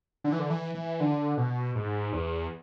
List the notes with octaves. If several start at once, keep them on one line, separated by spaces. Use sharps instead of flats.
D3
E3
D3
E3
E3
D3
B2
G#2
E2